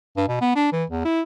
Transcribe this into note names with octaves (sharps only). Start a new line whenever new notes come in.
G2
B2
B3
D4
E3
E2
E4